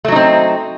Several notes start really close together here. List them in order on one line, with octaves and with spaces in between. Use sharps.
A3 F#3 D#4 C4